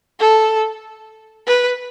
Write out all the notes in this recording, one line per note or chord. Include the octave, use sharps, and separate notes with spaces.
A4
B4